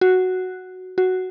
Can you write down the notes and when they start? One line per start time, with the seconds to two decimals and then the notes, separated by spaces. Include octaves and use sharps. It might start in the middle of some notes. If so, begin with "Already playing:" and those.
0.01 F#4
0.98 F#4